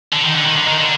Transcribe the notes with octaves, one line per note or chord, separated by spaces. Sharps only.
D3
D#3
D3
D#3
D3
D#3
D3